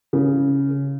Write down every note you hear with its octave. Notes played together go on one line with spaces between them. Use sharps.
C#3